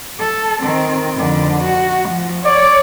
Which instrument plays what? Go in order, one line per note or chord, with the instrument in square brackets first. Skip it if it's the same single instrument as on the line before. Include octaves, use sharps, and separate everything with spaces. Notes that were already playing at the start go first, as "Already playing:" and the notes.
[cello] A4
D#3 C4
F2 D3
F#4
F3
[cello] C#5 [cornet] D5